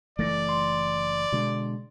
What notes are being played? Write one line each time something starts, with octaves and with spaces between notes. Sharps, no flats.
F#1 E3 A3 D#4 D5 A6 A#6
C6
B2 D3 G#3